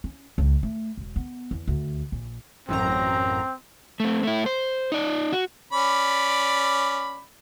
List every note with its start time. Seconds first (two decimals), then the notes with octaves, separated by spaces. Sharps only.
0.04 C#4
0.38 C#2
0.63 A3
0.97 E1
1.16 B3
1.51 E2
1.68 D2
2.12 A#1
2.69 A1 F#2 C4 A#5
4.00 A3 C4
4.23 A3 E4
4.46 C5
4.92 D#4 D5
5.32 F#4
5.73 C#4 D5 B5